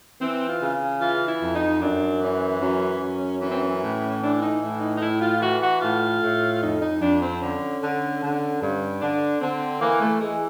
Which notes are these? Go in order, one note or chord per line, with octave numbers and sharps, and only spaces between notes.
E3 C4
F4
C#3
E3 F4
E4
F2
D#4
F#2 D4
E3 C#4
F#2 C#4
F#2
E3 C#4
C4
C#4
A2
E3 D4
D#4
A2 E4
D#4
D#4
A2 E4
F4
E3 F#4
F#4
A2 F4
A2
F2 D#4
D#4
F2 D4
C4
D3 C#4
D3
D3
G2
D3 D4
D3 C4
E3 A#3
A3
E3 G#3